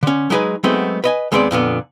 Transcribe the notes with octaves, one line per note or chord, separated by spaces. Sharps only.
D3 C#4
F#3 G#3 B3 D#4 G#4 B4
F#3 G#3 A3 B3 C4 D#4
B4 D#5 G#5
D#2 G#3 B3 C4 C5 D5
F2 A#2 D3 B3